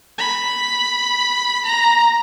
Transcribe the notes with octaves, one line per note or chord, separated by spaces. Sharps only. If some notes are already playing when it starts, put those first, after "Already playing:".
B5
A#5